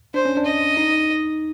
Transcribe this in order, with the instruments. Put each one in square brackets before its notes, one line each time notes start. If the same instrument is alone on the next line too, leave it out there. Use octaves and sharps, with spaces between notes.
[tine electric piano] D4 [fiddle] C5
[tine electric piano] C#4
D4
[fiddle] D#5
[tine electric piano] D#4